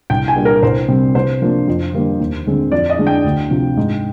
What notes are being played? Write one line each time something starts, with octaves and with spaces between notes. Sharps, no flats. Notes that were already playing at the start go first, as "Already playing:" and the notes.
C2 G5
G#5
A#2 G3 A#3 D4
A#4
C2 C5
C3 G3 C4
C3 C5
F3 A#3 D4
F2
D3 G3 A#3
D#2
D3 G#3 C4
F2 D5
D#5
D3 G#3 D4
G5
D2
C3 F3
G#2